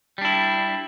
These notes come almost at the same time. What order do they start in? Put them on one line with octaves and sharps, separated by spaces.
G3 D4 E4